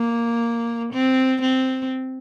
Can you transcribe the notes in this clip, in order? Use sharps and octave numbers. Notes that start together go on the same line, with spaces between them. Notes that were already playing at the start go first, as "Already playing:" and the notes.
Already playing: A#3
C4
C4